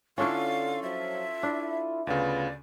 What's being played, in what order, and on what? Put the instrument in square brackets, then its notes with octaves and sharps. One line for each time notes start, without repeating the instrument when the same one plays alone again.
[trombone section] D3 [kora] C#4 D4 E4 [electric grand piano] F4 A4 C#6 [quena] F5
[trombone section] F3 F#3 [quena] E5
[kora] D4 [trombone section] E4
[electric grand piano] D2 C#3 [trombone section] B3 F4 B4 [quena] D5